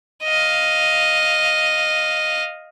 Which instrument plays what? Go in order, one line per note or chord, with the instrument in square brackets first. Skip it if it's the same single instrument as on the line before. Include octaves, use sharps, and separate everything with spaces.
[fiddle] D#5 F5